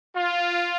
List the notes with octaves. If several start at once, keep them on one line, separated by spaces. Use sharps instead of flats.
F4